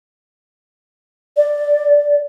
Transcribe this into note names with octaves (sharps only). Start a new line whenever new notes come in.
D5